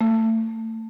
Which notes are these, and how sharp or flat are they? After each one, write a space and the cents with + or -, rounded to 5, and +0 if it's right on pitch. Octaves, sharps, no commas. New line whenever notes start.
A3 +30